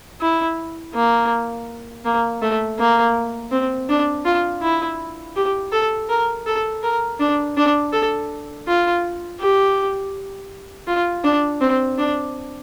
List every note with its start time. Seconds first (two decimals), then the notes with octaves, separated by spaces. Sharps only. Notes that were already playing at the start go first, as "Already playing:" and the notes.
0.21 E4
0.95 A#3
2.05 A#3
2.42 A3
2.79 A#3
3.52 C4
3.89 D4
4.25 F4
4.62 E4
5.36 G4
5.72 A4
6.09 A#4
6.46 A4
6.83 A#4
7.20 D4
7.57 D4
7.93 A4
8.68 F4
9.40 G4
10.87 F4
11.24 D4
11.61 C4
11.98 D4